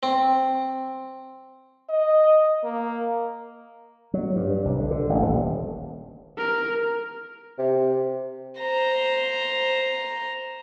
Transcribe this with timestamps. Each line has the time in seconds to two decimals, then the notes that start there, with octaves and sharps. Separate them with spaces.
0.03 C4
1.89 D#5
2.64 A#3
4.14 F#3
4.36 G2
4.65 C2
4.80 D3
4.91 D3
5.09 A1
5.22 D#1
6.38 A#4
7.58 C3
8.60 C5 A#5